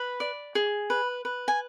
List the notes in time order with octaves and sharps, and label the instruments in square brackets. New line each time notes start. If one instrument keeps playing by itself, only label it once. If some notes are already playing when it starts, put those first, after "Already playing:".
Already playing: [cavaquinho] B4 B5
D5
G#4
B4
B4
G#5